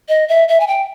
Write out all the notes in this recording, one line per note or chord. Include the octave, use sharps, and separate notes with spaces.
D#5
E5
E5
G#5
G5